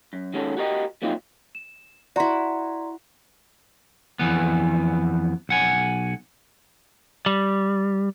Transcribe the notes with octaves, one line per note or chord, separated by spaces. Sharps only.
F#2
D#3 G#3 C#4 F#4 G4 A4
F#4 G4 A#4 C#5 D#5
F3 F#3 A#3 C4 D#4 F4
E7
E4 F#4 D5 A#5 C6
F2 E3 B3
B1 F#5 G#5
G3